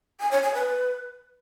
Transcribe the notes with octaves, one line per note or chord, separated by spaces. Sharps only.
G#5
C#5
G#5
B4